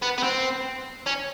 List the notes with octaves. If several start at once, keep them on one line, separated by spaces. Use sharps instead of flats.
B3
B3
C4
C#4